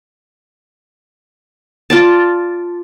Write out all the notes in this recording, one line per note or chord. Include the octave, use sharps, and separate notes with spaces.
F4 D5 A5